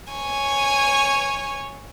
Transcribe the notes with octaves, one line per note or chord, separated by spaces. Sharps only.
C#5 G#5